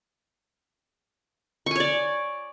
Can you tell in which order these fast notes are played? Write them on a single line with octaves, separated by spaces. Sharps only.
C#6 G#5 C#5 D5